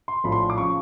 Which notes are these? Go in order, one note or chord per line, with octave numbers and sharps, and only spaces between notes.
C6
A#1 A2 F3 B5
C6
D6
C#3 F3 C#6